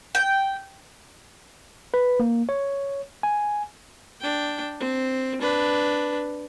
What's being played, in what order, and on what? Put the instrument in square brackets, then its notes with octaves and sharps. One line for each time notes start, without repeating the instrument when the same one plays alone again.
[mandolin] G5
[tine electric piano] B4
A#3
C#5
G#5
[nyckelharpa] D4 G5
C4
D4 B4